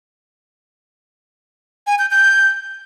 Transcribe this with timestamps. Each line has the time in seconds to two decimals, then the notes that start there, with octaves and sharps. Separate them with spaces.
1.87 G#5
1.99 G6
2.11 G6